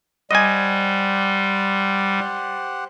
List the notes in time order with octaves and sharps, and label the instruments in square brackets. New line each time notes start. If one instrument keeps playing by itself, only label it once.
[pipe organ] G3 [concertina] G4 C5 F#5 [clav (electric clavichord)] D#5 G#5